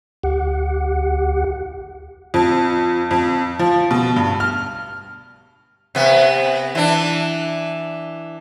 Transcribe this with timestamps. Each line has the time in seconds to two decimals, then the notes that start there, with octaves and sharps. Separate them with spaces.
0.23 D2 G4 F#5
2.34 F2
3.11 F2
3.59 F3
3.91 B2
4.16 G2
4.40 F6
5.95 C3 B3
6.75 E3 D4